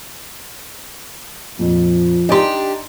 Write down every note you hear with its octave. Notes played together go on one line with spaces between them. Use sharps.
F2 A#2 F3
D4 D#4 G4 D5 G#5 A#5 C6